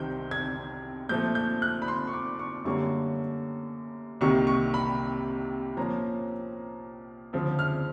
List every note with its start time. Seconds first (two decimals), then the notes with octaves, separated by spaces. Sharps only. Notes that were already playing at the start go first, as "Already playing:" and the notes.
Already playing: C2 C3 D#3 G3 C4 G6
0.31 G#6
1.09 A#2 F3 A3 G6
1.35 G6
1.62 F#6
1.82 B5
1.88 C6
2.07 C#6
2.13 D6
2.39 C#6
2.65 F#2 D3 G3 A#3 C#4 C#6
4.21 C2 C3 D#3 G3 A#3 C#6
4.47 C#6
4.74 B5
5.77 A#2 F3 A#3 C#4 A#5
7.33 D2 C#3 F3
7.59 F6